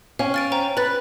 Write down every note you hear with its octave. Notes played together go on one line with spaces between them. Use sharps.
C#4 F5 G5
F6 A6 D7
C5 G5 A#5
B4 B5 F#6 A6